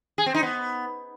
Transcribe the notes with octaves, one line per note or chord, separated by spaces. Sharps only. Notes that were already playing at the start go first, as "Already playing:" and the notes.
G#4
C4
D#4
B3